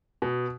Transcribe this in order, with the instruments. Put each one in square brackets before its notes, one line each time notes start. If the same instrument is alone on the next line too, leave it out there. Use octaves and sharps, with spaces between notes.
[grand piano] B2